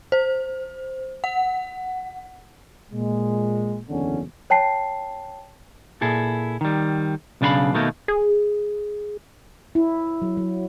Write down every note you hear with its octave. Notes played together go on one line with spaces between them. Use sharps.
C5
F#5
A#2 G#3
F#1 E2 D3 C#4
C#5 G5 A5 C7
A#2 E4 G#4 A4
D#3 G3
B1 C#3 D4 B4 F5 B5
B2 D#3 A3 A#3 D#4
G#4
E4
F#3
F#3